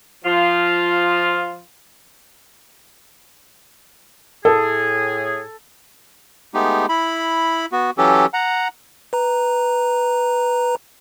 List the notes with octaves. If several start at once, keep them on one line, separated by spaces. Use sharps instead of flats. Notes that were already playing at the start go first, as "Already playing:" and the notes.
F3 F4
A2 G#4 A4
G#3 A3 B3 D#4 G4
E4 B5
B3 F#4
E3 F#3 C#4 G4 A4
F#5 A#5
B4 A#5